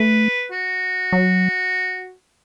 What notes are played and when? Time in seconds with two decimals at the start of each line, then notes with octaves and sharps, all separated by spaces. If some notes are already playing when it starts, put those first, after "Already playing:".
Already playing: A3 B4
0.52 F#4
1.12 F#3